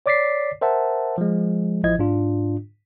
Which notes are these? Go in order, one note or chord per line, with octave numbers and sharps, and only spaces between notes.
C#5 D5 D6 A6 B6 C7
A#4 C5 E5 F#5 A5
F3 G#3
A1 F3 E4 D#5 G#6
G#2 D4 F4